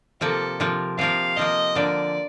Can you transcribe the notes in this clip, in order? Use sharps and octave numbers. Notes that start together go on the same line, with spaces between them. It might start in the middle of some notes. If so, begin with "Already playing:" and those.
C3 F3 A#3 A4
C3 F3 A#3
C3 F3 A#3 F5
C3 F3 A#3 D#5
D3 F3 A#3 D5